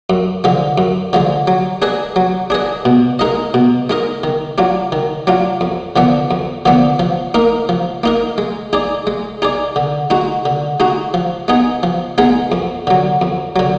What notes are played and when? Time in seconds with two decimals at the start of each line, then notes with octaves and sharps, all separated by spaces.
0.10 F#2
0.44 D3 F3 G#3
0.78 F#2
1.13 D3 F3 G#3
1.47 F#3
1.82 D4 G#4 B4 D#5
2.16 F#3
2.50 D4 G#4 B4 D#5
2.85 B2
3.19 G#3 D#4 A#4 D#5
3.54 B2
3.90 G#3 D#4 A#4 D#5
4.24 D#3
4.58 F#3 D4 F4
4.92 D#3
5.27 F#3 D4 F4
5.61 F2
5.96 D3 F3 B3 D4
6.31 F2
6.65 D3 F3 B3 D4
6.99 F3
7.34 A#3 D#4 A#4
7.69 F3
8.03 A#3 D#4 A#4
8.38 G#3
8.73 D#4 G#4 D5
9.07 G#3
9.42 D#4 G#4 D5
9.76 D3
10.10 G#3 D#4 F#4
10.46 D3
10.80 G#3 D#4 F#4
11.14 F3
11.48 G#3 B3 D#4 G#4
11.83 F3
12.18 G#3 B3 D#4 G#4
12.52 F2
12.87 D3 F#3
13.21 F2
13.56 D3 F#3